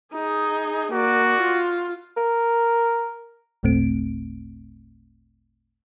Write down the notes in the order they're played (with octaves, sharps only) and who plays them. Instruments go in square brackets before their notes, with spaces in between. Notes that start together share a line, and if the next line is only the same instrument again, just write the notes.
[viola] D#4 G#4
[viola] A#3 D5 [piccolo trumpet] F#4
[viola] F4
[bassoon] A#4
[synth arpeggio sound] G#1 D#2 A#2 A3 C4 D7